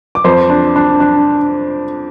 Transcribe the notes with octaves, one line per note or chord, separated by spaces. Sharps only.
D6
F2 C5 C6
D4
D4
D4